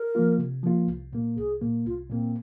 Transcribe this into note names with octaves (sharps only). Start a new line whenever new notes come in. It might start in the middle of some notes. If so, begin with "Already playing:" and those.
Already playing: A#4
F3 A#3 F4
C3
F3 A#3 F4
C2
A#2 A#3
C2 G#4
A#2 A#3
C2 F4
A#2 A#3 C4